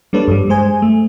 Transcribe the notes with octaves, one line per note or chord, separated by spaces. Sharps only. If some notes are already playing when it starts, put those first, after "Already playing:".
G3 A#3 D4 A4 B4 C#5
G2 G3
G#3 C5 G#5
A3